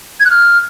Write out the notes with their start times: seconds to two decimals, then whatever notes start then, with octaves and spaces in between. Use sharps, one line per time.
0.20 G#6
0.25 F#6
0.31 F6